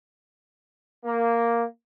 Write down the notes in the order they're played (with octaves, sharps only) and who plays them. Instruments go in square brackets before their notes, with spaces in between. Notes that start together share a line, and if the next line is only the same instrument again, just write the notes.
[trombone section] A#3